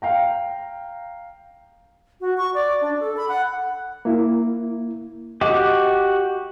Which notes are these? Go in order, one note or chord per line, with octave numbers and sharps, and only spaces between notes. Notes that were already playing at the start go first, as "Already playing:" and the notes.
F5 G5 A#5
F#4
C#6
D5
D4
A4
B5
F#5
A#3 E4
F#4 G4 D#5 D6